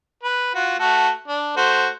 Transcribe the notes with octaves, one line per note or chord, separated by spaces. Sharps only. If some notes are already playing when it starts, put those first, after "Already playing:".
B4
F4 F#4
A3 F#4 A4
D4
A3 F#4 C5